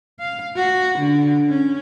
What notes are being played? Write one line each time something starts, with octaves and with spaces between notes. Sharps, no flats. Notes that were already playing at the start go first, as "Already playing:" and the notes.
F5
F#4
D3
C#4